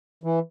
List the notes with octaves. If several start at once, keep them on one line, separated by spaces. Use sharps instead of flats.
E3